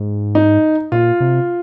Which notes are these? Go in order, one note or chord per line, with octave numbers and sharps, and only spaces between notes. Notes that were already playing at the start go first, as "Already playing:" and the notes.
Already playing: G#2
D#4
A#2 F4
C3